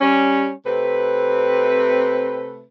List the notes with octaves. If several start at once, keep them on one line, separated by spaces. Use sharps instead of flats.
G3 C#4
C3 A3 C4 B4